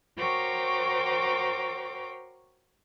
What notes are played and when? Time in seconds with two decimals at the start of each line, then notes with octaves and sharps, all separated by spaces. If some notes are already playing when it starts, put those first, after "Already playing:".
0.16 F#4 A#4 C5 C#5 G5 D6